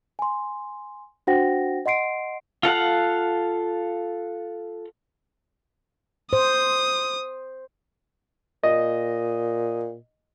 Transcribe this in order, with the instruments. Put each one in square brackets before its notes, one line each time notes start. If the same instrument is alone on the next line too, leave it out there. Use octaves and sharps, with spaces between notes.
[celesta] G#5 C6
D4 F#4 C5 F#5 G5 A#6
D#5 F#5 C6 C7 D7
[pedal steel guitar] F4 A4 F5 F#5
[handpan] C5 [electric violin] D#6
[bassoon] A#2 [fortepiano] D#5